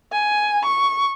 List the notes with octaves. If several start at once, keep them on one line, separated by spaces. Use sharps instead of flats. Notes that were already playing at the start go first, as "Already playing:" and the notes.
G#5
C#6